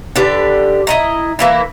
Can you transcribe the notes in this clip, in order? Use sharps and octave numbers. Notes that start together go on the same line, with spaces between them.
D3 D4 G4 B4
E4 D#5 A#5
E3 A#3 E4